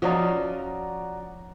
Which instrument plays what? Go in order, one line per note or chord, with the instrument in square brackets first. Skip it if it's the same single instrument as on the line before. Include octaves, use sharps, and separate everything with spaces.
[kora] F3 C#4 D#4 [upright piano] F#4 D5 A#5